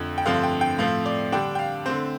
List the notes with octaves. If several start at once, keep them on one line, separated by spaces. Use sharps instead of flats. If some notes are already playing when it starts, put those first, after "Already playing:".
Already playing: F2 D3 F3 A3
G5
G2 D3 F3 A3 C4 F5
G5
G5
A2 F3 A3 C4 F5
D5
D3 G3 D4 G5
G5
F5
D3 A3 C4 C5